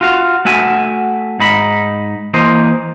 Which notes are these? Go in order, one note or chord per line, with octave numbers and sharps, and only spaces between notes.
F4 F#4 F5
A3 F#4 E5 G#5
G#2 D#4 B5
E3 A#3 C5 D#5